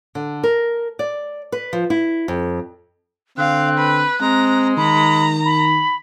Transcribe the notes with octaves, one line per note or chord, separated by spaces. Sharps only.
D3
A#4
D5
B4
F3
E4
F2
D3 C4 F5 F#6
B4
G#3 C4 A#5
D#3 A#5 B5
B5